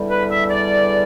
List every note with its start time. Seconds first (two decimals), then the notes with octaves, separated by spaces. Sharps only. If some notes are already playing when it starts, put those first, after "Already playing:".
Already playing: E2 D3 G3
0.10 B4
0.30 E5
0.50 D5